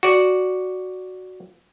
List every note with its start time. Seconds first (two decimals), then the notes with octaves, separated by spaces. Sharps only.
0.03 F#4 D5